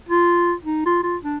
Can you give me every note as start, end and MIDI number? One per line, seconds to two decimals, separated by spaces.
0.09 0.53 65
0.65 0.81 63
0.85 1.00 65
1.03 1.17 65
1.23 1.38 62